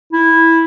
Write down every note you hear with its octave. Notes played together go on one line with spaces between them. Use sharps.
E4